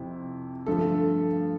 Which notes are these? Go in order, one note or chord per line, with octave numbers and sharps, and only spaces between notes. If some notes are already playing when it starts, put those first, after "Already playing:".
Already playing: F2 C3 E4
G2 D3 F3 A3 A4